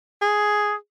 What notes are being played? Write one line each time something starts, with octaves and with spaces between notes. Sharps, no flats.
G#4